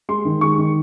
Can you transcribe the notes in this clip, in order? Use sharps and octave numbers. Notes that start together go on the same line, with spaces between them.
G#3 C6
D#3
G#3 C#6
D#3